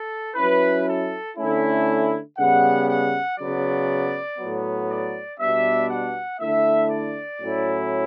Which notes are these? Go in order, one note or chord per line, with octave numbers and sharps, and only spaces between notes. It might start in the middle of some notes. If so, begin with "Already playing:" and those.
Already playing: A4
F#3 C#4 E4 B4
A4
D3 A3 C#4 E4
C#3 G3 B3 F#5
F#5
C#3 F#3 B3 D5
A2 F#3 B3
D5
B2 G3 B3 D4 E5
F#5
D3 A3 E4 E5
D5
A2 F#3 C#4 E4